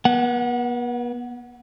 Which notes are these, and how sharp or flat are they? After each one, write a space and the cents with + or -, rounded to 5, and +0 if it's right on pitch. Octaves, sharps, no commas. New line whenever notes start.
B3 -40 F#5 +0